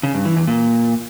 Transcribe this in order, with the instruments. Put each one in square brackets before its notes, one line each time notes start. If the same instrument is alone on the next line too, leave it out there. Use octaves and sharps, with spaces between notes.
[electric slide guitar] C#3
G2
E3
E2
A#2